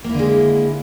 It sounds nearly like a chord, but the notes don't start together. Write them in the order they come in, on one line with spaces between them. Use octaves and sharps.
A#3 E4 D3 G#3